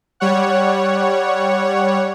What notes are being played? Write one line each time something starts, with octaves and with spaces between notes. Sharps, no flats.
G3 C#5 F#5